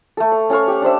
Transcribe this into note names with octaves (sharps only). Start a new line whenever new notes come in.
A3 A4
F5
C#4 A4 F5 C#6
G4 F#5
D4 C5 E5